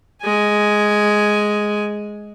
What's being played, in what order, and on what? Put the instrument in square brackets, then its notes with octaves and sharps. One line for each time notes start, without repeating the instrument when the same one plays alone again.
[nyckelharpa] G#3 G#5